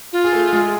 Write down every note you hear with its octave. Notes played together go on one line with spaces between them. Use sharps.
F4
G#4
A3 A4
G#3 G#4